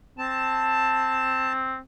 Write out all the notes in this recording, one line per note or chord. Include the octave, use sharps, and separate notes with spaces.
C4 A5